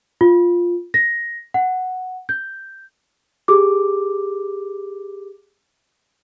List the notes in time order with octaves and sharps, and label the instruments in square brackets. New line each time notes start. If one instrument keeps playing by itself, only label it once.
[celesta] F4
A#6
F#5
G6
G4 G#4 D6